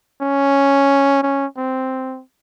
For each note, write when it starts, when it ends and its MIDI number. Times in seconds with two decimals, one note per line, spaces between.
0.21 1.19 61
1.23 1.46 61
1.58 2.22 60